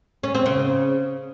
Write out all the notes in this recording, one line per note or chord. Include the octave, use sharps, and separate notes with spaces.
C#4
C4
C#3